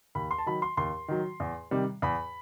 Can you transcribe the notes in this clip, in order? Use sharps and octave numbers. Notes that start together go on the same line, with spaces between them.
D#2 B5
C6
A5
D#3 F#3 B5
C6
D#2 C6
D#3 F#3
E2
C3 D#3 G3
E2 B5